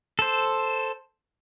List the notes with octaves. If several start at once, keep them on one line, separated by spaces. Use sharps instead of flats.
A4 C5